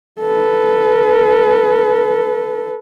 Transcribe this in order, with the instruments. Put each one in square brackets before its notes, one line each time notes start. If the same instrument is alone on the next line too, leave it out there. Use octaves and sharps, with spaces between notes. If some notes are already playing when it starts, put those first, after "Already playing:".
[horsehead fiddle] A4 B4